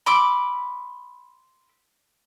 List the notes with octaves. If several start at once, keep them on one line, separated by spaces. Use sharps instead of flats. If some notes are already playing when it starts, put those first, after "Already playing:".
B5 C6 D6 E6